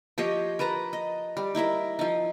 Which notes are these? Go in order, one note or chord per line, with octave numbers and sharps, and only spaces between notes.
F3 G4 C#5 D#5
A#4 B4 A5 A#5
D#5
G3
D#4 E4 A#4 E5
F3 D#4